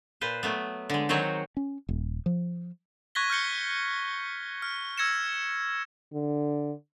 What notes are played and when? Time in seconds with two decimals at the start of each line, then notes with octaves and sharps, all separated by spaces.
0.21 A#2 B4 C5
0.43 F#3 A3 B3
0.90 D3 G#3
1.09 D#3 F#3 G#3 C4 F#4 C#5
1.57 C#4
1.89 D#1
2.26 F3
3.15 C#6 F#6 G#6 A#6 B6 G7
3.30 F6 G6 C#7 G7
4.62 F6
4.98 E6 G#6 A#6 C#7 E7
6.13 D3